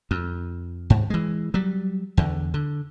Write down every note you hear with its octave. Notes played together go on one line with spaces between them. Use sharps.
F2
G#2
E3 G#3
F#3 G3
E2 D3
D3